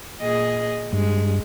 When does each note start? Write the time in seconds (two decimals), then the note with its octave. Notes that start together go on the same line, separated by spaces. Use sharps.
0.21 A#2 G#4 D#5
0.93 G2 G#3